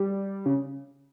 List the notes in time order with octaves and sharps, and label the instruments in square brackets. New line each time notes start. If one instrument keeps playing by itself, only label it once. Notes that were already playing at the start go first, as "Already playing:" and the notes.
Already playing: [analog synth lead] G3
C#3